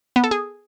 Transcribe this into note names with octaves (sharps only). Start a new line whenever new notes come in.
B3
A4
G#4